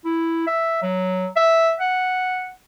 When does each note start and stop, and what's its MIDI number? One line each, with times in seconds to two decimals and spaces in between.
0.05 0.43 64
0.47 0.80 76
0.82 1.27 54
1.36 1.72 76
1.80 2.53 78